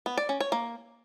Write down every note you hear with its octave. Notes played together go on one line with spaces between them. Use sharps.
B3
D5
C#4
C#5
A#3